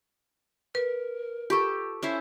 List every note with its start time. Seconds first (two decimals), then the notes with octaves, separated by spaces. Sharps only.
0.75 A#4 B4
1.50 F4 G4 A4 C#6
2.03 C#4 E4 C5 E5